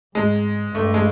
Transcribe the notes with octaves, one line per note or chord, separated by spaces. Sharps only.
G#2 G#3
G2 A3
G#3